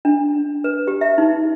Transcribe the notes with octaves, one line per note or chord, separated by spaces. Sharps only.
D4
B4
G4
E5
D#4